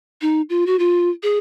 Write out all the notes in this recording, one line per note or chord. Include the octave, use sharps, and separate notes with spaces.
D#4
F4
F#4
F4
G#4